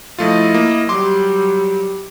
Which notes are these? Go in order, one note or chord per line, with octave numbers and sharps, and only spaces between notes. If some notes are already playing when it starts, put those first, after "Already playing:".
F3 A3 E4 F4 D#5
A#3
F#3 G3 C6 D6